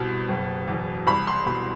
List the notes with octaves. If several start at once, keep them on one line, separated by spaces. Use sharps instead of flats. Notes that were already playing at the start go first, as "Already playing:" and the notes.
Already playing: C2 B2
F#1
E2
C2 B5
C6
B2 B5